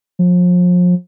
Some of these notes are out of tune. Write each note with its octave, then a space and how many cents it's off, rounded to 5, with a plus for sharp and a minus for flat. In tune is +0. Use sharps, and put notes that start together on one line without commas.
F3 +35